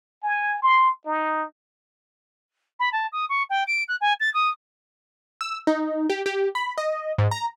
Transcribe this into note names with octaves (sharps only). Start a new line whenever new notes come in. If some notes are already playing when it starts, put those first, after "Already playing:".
G#5
C6
D#4
B5
A5
D#6
C#6
G5
D7
F#6
G#5
A6
D#6
E6
D#4
G4
G4
B5
D#5
G#2
A#5